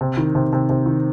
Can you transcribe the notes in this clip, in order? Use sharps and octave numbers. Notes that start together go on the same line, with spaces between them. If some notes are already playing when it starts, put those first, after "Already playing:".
C3
D#3
C3
C3
C3
D#3